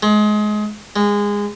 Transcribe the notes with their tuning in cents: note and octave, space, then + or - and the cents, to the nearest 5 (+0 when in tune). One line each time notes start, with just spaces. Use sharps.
G#3 +25
G#3 -20